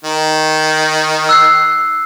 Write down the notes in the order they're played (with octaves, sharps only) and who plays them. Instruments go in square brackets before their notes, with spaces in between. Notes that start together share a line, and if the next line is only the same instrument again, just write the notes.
[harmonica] D#3
[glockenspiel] E6 F#6 C7